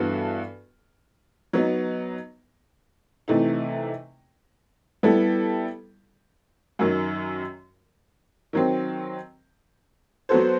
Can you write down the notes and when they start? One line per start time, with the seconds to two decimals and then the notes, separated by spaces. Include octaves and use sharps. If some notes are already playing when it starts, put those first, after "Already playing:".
Already playing: G2 E3 B3 F#4 A4
1.53 F#3 B3 D#4
3.28 C3 E3 A3 D#4
5.03 G3 B3 E4 A4
6.79 F#2 D#3 F#3
8.53 D#3 F#3 C4
10.29 F#3 B3 F#4 A4 C5